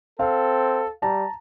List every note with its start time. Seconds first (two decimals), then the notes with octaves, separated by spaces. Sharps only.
0.19 C4 A4 F5
1.02 G3 A5 A#5